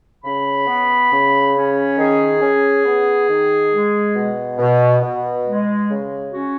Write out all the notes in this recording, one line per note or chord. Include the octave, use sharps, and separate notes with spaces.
C#3 B5
B3
C#3
C#4
D#3 G#4
C#4
B3
D#3
G#3
B2
B2
B2
G#3
C#3
C#4 F#4